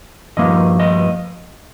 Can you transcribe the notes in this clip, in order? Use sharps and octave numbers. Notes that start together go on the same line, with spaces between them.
G2 F3 A#3 D#5
D#5